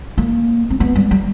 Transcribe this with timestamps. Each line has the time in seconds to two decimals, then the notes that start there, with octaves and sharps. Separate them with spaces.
0.18 A#3
0.70 C4
0.80 B3
0.96 G3
1.11 G3